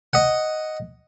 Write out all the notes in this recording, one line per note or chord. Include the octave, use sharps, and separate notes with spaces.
D#5 F#5